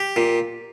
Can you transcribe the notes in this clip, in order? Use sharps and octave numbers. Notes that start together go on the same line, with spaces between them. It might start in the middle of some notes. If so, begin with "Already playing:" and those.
Already playing: G4
A#2